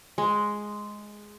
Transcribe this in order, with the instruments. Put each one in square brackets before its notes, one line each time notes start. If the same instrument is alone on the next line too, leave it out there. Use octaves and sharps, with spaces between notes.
[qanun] G#3